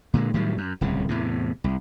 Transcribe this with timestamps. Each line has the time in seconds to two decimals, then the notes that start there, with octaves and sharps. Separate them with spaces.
0.14 A#2 D3 G#3
0.34 A2 D#3 F#3 G3
0.58 F#2
0.81 D1 C2 C#3
1.09 E2 A2 C3
1.64 C2